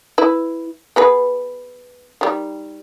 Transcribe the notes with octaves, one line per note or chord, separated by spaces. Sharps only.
E4 B4
B3 G#4 B4
D#3 G3